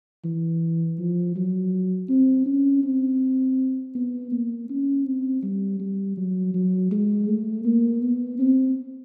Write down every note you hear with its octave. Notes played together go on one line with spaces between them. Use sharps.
E3
F3
F#3
C4
C#4
C4
B3
A#3
C#4
C4
G3
G3
F#3
F#3
G#3
A3
A#3
B3
C4